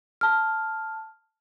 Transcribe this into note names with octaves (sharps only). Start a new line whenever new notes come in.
A5 F6